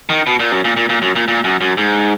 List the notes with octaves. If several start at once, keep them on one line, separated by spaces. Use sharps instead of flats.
D#3
B2
A#2
F#2
A#2
A#2
A#2
F#2
A#2
A#2
F#2
F#2
G#2